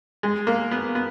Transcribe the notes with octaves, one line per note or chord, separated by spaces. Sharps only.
G#3
A#3
B3
B3